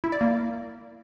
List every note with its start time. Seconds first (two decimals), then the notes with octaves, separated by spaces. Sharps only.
0.04 E4
0.12 D5
0.21 A#3